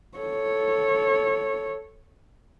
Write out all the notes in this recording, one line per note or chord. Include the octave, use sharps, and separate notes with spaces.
A4 C#5